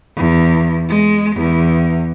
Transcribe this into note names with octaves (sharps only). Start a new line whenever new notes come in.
E2
G#3
E2